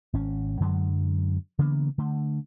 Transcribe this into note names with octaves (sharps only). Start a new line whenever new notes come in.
G#1 C#4
F#2 D3 F#3 G#3
C#3 E3 A#3 B3
D3 A3